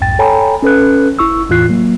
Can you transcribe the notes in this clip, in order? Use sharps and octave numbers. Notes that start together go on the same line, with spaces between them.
B1 F2 G#2 G5 A6
A4 C#5 G5 G#5 A#5 B5
C#4 A4 B4 F#6
G1 E4 C#6 E6
E2 A2 E3 F4 F#6 C7
F#3 A#3